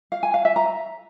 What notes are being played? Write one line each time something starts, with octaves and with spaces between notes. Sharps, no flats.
F5
G#5
F5
E5
A#5